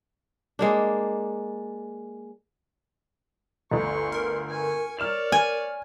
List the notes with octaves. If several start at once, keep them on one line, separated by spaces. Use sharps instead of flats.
G#3 A#3 D4
G1 D2 C6 C#6
A#4
G#5 C#6
C#5 D5 F6 E7 F7
G#5